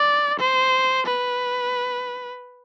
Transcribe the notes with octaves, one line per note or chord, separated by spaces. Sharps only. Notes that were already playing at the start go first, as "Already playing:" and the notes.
Already playing: D5
C5
B4